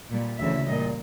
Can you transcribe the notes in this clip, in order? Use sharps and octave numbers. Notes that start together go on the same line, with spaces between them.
A#2 G3
D2 C#3 E3 E5
A#2 G3 D#5